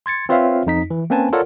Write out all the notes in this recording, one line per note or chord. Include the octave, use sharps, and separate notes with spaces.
C6 G#6 A6 C#7
C4 F4 B4 C#5 E5 F5
F2 D#4 B6
E3
A#3 C4 C#4 B4 G#5 A5
F4 A4 A#4 C#5 D5 F#5